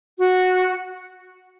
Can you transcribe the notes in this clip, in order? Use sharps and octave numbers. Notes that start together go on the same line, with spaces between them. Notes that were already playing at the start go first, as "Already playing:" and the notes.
F#4